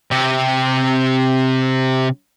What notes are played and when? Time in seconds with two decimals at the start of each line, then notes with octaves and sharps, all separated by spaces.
0.11 C3 G4